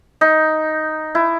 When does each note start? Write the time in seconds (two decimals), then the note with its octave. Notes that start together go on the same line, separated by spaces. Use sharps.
0.21 D#4
1.15 E4